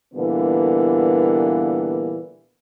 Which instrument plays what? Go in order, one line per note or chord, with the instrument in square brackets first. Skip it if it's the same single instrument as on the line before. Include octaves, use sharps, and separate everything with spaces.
[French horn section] A#2 D3 E3 G3 A#3 B3